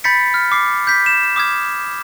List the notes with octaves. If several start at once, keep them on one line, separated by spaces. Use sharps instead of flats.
B5 G6 A6 B6 C#7
F6
D6 C7
G6 B6
E7
D6 D#6 F6 G#6